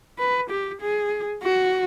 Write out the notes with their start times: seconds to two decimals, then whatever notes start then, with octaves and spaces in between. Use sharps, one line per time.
0.19 B4
0.50 G4
0.81 G#4
1.43 F#4